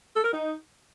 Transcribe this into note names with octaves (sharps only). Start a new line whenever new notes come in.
A4
A#4
D#4